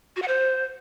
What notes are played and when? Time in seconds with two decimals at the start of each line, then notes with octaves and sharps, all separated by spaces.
0.16 F#4
0.22 F#5
0.28 C5